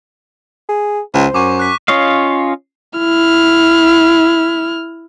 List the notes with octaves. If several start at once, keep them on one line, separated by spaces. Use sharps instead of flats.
G#4
C#2 C5
F#2 C#6 D6
F#6 B6
C#4 F4 C#5 D#5 F5
E4 F6